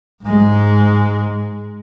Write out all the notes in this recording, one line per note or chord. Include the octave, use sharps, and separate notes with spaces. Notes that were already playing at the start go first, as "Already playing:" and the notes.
G#2 G#3